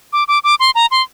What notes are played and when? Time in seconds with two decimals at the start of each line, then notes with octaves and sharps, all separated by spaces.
0.13 D6
0.28 D6
0.44 D6
0.60 C6
0.75 A#5
0.91 C6